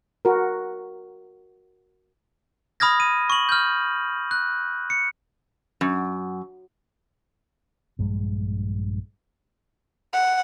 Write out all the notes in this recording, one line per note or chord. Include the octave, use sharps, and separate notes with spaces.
F#4 A#4
B5 D#6 F6 G#6 A#6
D#7
C#6 F#7
F6 G6
F#6
C#7
F#2
A#1 G2 G#3
F#5